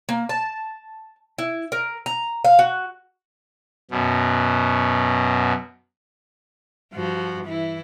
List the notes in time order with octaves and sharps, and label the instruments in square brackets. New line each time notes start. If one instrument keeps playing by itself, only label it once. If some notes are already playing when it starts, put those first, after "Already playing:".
[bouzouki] A#3
A5
E4
A#4
A#5
F5
F#4
[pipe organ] F#2 B2
[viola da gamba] G2 F3 F#4
E3 E4